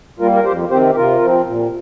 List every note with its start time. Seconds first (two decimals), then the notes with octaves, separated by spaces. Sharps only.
0.19 G3 A#3 F4 A#4
0.34 A#4
0.45 F2 G4 C5
0.70 C3 D#3 C4 G4 C5
0.91 G4
0.96 C3 F4 A#4
1.21 F3 C4
1.47 A#2